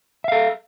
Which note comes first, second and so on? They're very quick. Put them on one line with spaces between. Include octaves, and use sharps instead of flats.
E5 F5 A4